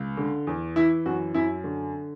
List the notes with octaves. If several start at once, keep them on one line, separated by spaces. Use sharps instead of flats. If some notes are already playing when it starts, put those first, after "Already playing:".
Already playing: C#2
D3
E2
E3 E4
F#2 F#4
F#2 E4
D3